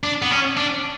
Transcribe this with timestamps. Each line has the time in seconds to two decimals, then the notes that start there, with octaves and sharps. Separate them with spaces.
0.03 D4
0.22 B3
0.31 C#4
0.57 D4